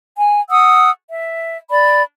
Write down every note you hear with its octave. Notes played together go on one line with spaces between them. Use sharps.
G#5
F#5 D#6 E6
E5
D5 B5